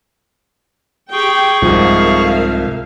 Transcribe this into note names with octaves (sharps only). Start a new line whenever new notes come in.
G4 G#4 G5 C#6
C2 G#2 F3 A#4 E5 F5